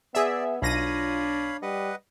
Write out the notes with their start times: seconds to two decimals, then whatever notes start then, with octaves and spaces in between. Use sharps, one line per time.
0.15 B3 G#4 D5 E5
0.62 B1 D4 F4 C#5 F5 B5 A#6 D#7
1.62 G3 B4 D#5 F#5